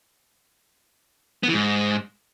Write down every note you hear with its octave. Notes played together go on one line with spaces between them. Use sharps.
B3
E3
G#2